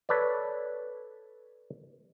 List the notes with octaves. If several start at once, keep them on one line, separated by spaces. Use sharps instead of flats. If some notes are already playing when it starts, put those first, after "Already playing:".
A4 B4 C#5 D5